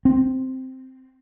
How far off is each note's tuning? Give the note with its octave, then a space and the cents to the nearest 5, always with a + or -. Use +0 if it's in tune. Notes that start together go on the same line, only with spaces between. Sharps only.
C4 -5